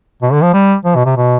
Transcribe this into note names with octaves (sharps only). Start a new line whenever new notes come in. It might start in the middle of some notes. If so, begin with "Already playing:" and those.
B2
D3
F3
G3
F3
B2
C3
B2